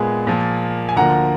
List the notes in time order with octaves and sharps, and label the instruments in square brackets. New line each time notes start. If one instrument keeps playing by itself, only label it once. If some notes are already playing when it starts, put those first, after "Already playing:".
Already playing: [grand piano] A#2 G#3 B3 G#4
A#2 F3 A#3
G#5
D2 D3 F3 A#3 F#5 A#5